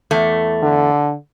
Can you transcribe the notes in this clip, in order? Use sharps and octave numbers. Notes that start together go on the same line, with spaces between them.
E2 A3
D3